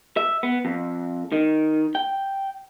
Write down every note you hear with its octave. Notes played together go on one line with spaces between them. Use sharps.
E5
B3
F2
D#3
G5